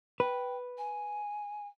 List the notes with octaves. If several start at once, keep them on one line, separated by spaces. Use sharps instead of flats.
B4 G5
G#5